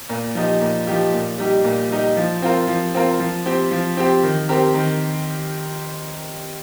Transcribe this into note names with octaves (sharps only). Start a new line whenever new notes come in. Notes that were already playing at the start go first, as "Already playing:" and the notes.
A#2
F3 D#4 G4
A#2
F3 D#4 G4
A#2
G3 D#4 G4
A#2
G3 D#4 G4
F3
C4 F4 A#4
F3
C4 F4 A#4
F3
C4 G4
F3
C4 G4
D#3
C4 G4 A#4
D#3